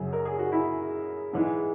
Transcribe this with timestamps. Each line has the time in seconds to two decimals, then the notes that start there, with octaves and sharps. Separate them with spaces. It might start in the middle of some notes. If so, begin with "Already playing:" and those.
Already playing: F#2 C#3 F#3
0.13 A#4
0.25 G#4
0.39 F#4
0.52 E4
1.33 G#2 E3 G#3